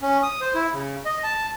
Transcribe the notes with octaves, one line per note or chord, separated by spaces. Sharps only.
C#4
D#6
C5
E4
C#3
D#5
A5